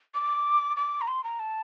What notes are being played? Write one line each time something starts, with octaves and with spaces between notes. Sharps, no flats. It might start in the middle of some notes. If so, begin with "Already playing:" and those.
D6
D6
A#5
C6
A#5
A5